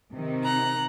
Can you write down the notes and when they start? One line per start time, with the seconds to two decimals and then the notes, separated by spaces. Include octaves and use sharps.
0.13 C3 D#3
0.43 A#5 F#6